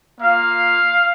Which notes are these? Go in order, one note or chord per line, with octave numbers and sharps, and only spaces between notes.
A#3 F4 F5